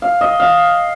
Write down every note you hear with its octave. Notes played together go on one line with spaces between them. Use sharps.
F5
D#5
F5